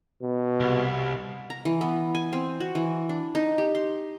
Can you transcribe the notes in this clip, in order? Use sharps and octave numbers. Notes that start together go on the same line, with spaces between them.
B2
C2
A#5
E3
B3
G#5
C4
F#4
E3
D4
D#4
G4
C6